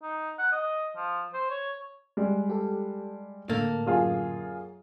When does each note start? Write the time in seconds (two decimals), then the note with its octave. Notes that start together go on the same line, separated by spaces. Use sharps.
0.03 D#4
0.39 F#5
0.52 D#5
0.96 F3
1.33 C5
1.50 C#5
2.17 G3 G#3
2.49 G4 A4
3.49 A2 D3 A#3 A4
3.86 F#2 F4 G#4